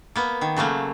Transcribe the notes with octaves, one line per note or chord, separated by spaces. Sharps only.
A#3 B3
D#3
C#3 F#3 A3 A#3